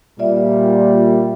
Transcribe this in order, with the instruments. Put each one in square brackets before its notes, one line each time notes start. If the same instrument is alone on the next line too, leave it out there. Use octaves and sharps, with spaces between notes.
[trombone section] A#2 G3 [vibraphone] F4 D5 E5